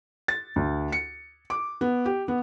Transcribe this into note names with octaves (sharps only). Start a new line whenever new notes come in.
A6
D2
C#7
D6
B3
G4
B3